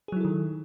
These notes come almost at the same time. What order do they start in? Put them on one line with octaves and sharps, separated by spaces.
G#4 F#3 E4 A4 D#3